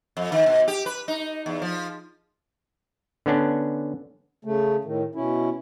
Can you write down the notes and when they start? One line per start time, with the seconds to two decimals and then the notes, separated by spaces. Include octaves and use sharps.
0.17 F2
0.32 D#3
0.46 B2
0.68 G4
0.86 B4
1.08 D#4
1.46 E2
1.62 F3
3.26 D3 B3 C#4 D4
4.45 C#3 A3
4.84 A2 D#3
5.15 B2 C#4 E4